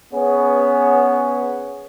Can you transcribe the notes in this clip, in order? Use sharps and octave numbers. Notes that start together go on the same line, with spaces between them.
B3 C#4 G#4 B4 C#5